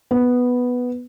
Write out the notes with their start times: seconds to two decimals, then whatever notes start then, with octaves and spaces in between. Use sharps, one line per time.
0.11 B3